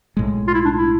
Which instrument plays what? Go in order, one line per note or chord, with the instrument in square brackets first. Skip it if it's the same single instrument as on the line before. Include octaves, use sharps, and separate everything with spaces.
[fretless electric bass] B1 A2 G#3
[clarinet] F4
E4
D4
E4